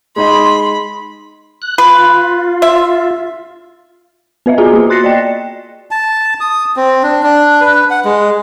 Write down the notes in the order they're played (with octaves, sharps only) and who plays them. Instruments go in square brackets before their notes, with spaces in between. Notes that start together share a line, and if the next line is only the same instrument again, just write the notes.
[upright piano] G#3 D#4 D#5 [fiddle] B5 [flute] C6
[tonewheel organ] F#6
[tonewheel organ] F4 [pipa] B4
[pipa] E5
[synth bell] B3 B4 D#5 E5
F4 F#4 G#4 G#5 A#5
A#3 F#4
C6 F#6 A6 A#6 C7 C#7
D5 D#5 G5
[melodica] A5
D#6
C4
D4
D4
B4
F#5
G#3